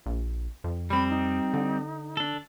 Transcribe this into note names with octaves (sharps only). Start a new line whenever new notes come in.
A#1
F2
G3 C4 B5
D#4
D3
D4 A4